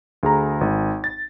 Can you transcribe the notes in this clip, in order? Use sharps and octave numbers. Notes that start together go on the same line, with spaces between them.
D2 G#4 A#5
G#1
A6